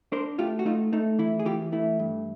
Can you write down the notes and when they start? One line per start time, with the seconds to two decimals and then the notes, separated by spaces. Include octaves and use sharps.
0.12 D4 A#4 C5
0.38 A3 F4 G4
0.59 F#4
0.65 A3 D#4 F4
0.93 A3 D#4
1.19 E3 E4
1.39 G#4
1.45 E3 F4 G4
1.72 A3 E4
1.99 G2